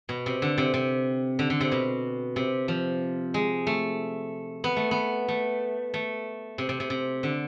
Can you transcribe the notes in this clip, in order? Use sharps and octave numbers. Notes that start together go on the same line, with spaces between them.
B2
C3
D3
C3
C3
D3
D3
C3
B2
C3
F3
G#3
A3
B3
A3
B3
A3
A3
C3
C3
C3
C3
D3